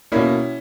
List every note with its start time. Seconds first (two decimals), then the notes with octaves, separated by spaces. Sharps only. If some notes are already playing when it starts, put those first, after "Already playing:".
0.12 B2 A#3 C#4 E4